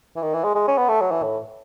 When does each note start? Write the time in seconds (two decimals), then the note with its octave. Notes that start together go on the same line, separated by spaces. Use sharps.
0.16 E3
0.22 D#3
0.34 E3
0.44 G#3
0.55 G#3
0.68 C#4
0.78 B3
0.89 A3
1.01 F#3
1.11 E3
1.23 A2